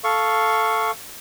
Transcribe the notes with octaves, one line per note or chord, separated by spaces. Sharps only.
A4 F5 C#6